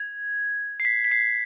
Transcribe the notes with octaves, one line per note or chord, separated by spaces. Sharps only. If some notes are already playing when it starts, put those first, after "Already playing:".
Already playing: G#6
C7
B6
B6
C7